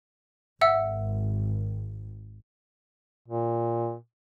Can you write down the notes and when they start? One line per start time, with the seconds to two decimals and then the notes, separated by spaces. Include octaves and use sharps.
0.61 G#1 E5 F#5 E6
3.28 A#2